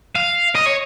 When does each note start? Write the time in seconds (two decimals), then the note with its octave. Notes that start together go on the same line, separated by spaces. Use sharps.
0.16 F5
0.55 D#5
0.66 C#5